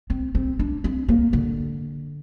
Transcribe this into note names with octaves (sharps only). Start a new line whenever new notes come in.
C4
C4
D4
C4
A#3
D3